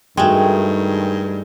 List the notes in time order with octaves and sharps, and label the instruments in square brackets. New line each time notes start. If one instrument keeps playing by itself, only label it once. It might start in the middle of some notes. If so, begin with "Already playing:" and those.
[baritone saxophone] G2 [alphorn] D#3 [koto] G#3 A3 [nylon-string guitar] F#4 G#4 G5